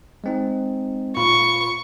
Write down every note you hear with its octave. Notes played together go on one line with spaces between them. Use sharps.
G#3 C4 D#4
A#2 F4 B5 C#6